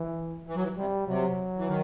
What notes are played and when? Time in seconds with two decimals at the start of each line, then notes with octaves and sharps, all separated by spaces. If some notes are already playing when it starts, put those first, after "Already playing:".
Already playing: E3
0.47 E3
0.55 F#3
0.63 E3
0.77 C3 G3
1.07 C3 F#3
1.57 E3
1.67 D#3